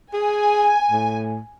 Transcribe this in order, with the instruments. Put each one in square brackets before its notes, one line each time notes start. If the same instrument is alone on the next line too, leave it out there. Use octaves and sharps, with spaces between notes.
[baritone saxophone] G#4 [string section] G#5
[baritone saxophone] A2